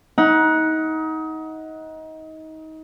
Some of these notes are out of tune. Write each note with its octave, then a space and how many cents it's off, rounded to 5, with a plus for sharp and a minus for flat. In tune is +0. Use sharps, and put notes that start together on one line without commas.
D#4 +25 F#5 +0